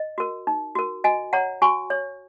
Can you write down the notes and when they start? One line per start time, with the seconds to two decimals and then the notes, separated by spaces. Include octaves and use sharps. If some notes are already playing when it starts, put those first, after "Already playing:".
Already playing: D#5
0.18 F#4 A#4
0.47 D#4
0.75 F#4 A#4
1.04 F#4 D#5 G#5
1.33 C#5 F#5 A#5
1.62 F#4 G#5 C#6
1.90 C#5